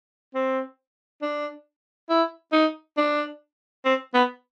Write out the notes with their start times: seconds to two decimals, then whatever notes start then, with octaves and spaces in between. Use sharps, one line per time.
0.34 C4
1.22 D4
2.10 E4
2.52 D#4
2.97 D4
3.85 C4
4.14 B3